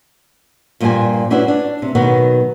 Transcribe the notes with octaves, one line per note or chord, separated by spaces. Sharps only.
G2 A#2 F3 G3 C5 G#5
C#4 D4 E4 F#4 B4 C5
D4
C3
B2 D#3 F#3 B3